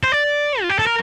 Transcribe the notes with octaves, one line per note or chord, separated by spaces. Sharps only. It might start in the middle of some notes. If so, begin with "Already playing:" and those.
C5
D5
F4
G4
A4
A#4